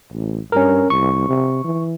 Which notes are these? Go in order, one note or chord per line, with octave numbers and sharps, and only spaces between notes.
A1
G2 C#4 A#4
C2 C#6
C3
E3